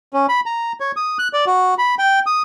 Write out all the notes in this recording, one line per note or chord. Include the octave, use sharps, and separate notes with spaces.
C#4
B5
A#5
C#5
D#6
F#6
D5
F#4
B5
G5
D#6